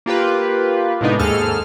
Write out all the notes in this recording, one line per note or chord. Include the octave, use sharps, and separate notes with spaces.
A#3 F4 G4 B4
A2 C3 G#3 B3 D4 D#4
D#2 G#2 G#4 A4 F6